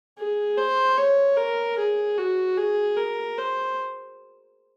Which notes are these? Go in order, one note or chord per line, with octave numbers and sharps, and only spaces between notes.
G#4
C5
C#5
A#4
G#4
F#4
G#4
A#4
C5